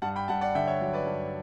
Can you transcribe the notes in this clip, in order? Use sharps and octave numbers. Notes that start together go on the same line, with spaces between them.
G2 F#5 A5
G5 B5
G2 F#5 A5
D5 F#5
D3 E5 G5
C#5 E5
F#3
B4 D5
G2